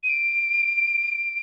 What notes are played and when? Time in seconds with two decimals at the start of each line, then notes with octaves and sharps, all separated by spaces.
0.03 D#7
0.09 D7